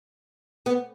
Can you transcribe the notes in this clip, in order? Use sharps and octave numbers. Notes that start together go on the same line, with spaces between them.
B3